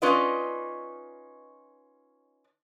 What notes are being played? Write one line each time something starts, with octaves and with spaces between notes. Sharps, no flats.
C#4 D#4 F4 B4 D5 D#5